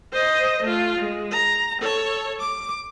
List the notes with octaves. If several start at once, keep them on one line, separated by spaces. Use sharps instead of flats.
C5 D#5
A3 F4
G#3
A#5
A4 C#5
D6